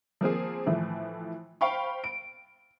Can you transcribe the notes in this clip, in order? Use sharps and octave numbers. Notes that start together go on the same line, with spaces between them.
F3 A#3 C4 G#4
A2 E3 F3 A3
C5 F5 G5 B5 C#6
D7